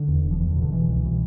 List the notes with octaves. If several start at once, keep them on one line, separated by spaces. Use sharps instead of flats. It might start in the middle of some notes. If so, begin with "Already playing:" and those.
Already playing: D3
E2
E1
F3
E2 E3
D3
B2
D3
B2 E3
C2
B2